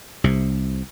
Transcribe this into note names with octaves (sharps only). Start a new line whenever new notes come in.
C2 C3